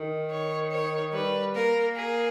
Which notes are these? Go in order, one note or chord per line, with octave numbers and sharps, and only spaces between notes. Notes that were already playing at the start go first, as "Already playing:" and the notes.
Already playing: D#3
C#5
C#5
G3 B4
A#3 A#4
G#4